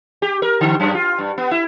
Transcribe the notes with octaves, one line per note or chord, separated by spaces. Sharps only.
G4
A#4
D3
F#2
F4
G2
B3
E4